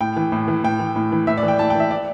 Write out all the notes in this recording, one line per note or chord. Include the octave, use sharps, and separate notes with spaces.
A2 G5
E3
A2
E3
A2 G5
E3
A2
E3
A2 E5
D5
E3
G5
A2 A5
G5
E3 E5
D5